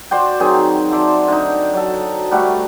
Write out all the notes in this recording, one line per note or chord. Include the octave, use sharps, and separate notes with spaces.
F#4 C5 D5 G5
D#3 F#3 C4 G#4
C5 D5 E5 A5
D3 D#4
F#3 A4
G3 A3 F#4